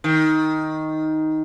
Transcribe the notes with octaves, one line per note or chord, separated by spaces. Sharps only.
D#3